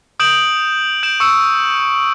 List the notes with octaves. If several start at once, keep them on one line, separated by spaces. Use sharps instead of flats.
D#6 G6 D7 E7 F#7
G6 D7 E7
C#6 E6 C#7 E7